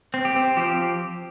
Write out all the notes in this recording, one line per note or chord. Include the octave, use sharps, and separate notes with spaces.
C4
G4
C4
F3 G4